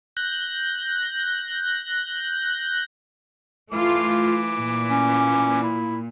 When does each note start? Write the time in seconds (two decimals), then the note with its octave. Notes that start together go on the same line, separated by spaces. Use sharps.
0.17 F#6 G6 A#6
3.72 E3 A3 F4 D6
4.57 A#2
4.90 C#4
5.63 E4